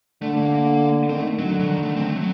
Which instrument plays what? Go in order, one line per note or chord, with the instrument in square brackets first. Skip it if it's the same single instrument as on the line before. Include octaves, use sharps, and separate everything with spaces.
[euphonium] D3 [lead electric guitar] A3
[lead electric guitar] A#3
[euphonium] D#3 [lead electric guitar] C4
[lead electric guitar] A3
[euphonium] D3 [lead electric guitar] F#3
[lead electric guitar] F#3
D#3
A3
C4
A3
F#3